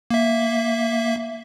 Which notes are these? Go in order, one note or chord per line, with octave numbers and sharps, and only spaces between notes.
A#3 E5